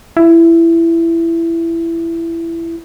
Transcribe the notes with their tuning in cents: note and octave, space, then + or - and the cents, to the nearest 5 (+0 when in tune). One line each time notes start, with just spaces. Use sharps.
E4 +15